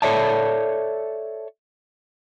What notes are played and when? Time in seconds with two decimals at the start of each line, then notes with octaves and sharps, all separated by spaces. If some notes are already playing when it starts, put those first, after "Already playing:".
0.02 A4 C#5 D5 E5 A5